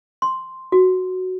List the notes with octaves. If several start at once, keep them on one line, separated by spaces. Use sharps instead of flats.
C6
F#4